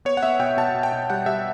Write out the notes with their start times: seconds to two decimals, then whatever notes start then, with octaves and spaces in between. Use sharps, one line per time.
0.05 B3 C#5
0.17 F#5
0.23 B3 E5
0.39 B2 G5
0.57 B2 A5
0.74 B2
0.83 G5
0.93 B2
1.10 G3 F#5
1.26 G3 E5